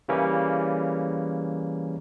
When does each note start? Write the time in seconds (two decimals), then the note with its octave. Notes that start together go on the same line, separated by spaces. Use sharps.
0.08 C#3 E3 G3 A#3 C#4